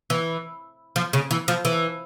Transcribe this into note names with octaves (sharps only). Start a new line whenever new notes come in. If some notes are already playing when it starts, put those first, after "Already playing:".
E3
F3
C#3
E3
F3
E3